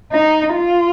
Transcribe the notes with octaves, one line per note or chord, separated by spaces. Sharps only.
D#4
F4